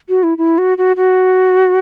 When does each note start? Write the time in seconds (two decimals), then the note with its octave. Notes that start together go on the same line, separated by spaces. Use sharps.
0.09 F#4
0.23 E4
0.38 E4
0.58 F#4
0.78 F#4
0.97 F#4